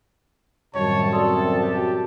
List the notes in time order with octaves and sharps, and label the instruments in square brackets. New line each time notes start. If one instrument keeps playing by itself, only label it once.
[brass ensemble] F#2 C3 [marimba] A2 D#3 G3 [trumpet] C#5 [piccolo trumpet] A5
[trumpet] A4 [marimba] D5 C6 D#6
[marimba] F#4 [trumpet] G4